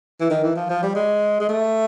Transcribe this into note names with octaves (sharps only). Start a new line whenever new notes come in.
E3
D#3
E3
F3
F3
G3
G#3
G#3
A3